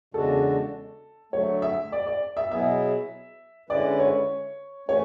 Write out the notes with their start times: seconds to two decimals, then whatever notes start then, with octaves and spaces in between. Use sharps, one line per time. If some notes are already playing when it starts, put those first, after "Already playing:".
0.14 E2 C#3 G#3 D4 F#4 A4
1.33 D3 F#3 A3 C#5
1.62 E5
1.92 D5
2.07 D5
2.37 E5
2.51 B2 F#3 B3 E4 G#4 E5
3.69 D3 G#3 C#4 E4 B4 D5
3.99 C#5
4.89 E3 A3 C#4 C#5